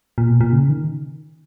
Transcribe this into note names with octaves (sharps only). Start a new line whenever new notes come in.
A#2
B2
A#2
C#3
D#3